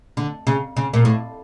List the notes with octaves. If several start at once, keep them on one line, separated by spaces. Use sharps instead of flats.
D3
C#3
C#3
A#2
A2